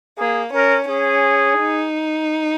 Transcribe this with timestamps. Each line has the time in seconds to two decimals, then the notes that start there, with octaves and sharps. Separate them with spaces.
0.17 A#3 G#4
0.53 C#4 A#4
0.89 C#4 G#4
1.60 D#4